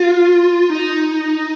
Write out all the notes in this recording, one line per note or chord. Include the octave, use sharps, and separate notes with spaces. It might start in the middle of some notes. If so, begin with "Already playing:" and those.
Already playing: F4
D#4